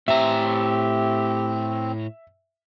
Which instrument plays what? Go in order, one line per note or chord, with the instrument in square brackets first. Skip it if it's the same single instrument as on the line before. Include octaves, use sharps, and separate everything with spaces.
[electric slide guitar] A2 A#5 [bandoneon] C4 [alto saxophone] G4 [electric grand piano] E5